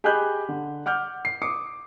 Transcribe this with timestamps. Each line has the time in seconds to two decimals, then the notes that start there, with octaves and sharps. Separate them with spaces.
0.04 G4 G#4 D#5 B5 F#6 G6
0.49 D3
0.86 F#5 D6 F6 G6
1.25 C7
1.42 D6 D#6 C7 C#7